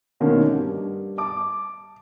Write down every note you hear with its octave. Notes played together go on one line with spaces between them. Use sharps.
B2 D3 D#3 A3 A#3 C#4
G2
A5 D6